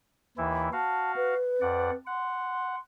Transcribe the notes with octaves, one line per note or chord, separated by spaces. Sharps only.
D#2 E3 E4
F#4 F5 A5
B4
F2 D5 F#5
F#5 C6